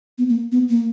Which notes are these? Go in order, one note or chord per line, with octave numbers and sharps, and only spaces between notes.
B3
A#3
B3
A#3